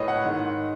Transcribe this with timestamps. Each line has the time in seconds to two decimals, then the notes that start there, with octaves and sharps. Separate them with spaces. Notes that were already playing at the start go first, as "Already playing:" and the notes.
Already playing: A2 G#3 B4 C#5 D#5
0.08 F#5
0.24 G#2 D#3 G#3